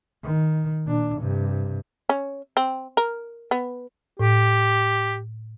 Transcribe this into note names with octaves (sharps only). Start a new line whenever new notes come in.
D#3
A#2 D4
G2 C3
C#4
C4
A#4
B3
A2 G4